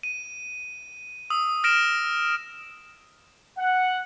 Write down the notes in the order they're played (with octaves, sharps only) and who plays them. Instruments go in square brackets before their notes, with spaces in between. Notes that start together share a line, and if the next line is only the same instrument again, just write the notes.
[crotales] D#7
D#6 E6
F6 A#6 D7 E7
[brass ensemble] F#5